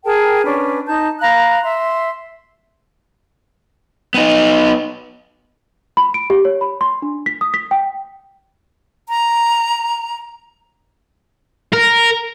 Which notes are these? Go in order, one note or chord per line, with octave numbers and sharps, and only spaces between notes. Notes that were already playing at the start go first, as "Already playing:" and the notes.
G#4 A#4 G5 A5
C#4 D4 B4
D#4 A5 G6
F5 A#5 B5 F#6
E5 C6
B3 D#4
B5
D7
G4
C#5
B5
C6
D4
B6
D#6
B6
G5
A#5
A#4